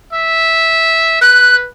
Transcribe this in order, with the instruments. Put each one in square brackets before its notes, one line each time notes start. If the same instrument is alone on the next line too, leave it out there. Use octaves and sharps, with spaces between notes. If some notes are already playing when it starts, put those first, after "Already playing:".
[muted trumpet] E5
[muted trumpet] B4 [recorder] F#6